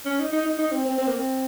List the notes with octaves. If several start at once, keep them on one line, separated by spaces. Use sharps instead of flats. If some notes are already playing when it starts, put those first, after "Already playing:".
C#4
D#4
D#4
D#4
D#4
C4
C4
C4
A#3
C4